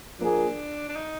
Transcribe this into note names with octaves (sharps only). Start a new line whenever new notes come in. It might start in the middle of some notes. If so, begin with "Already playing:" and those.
F3 A#3 D4 F4 G#4
D4
D#4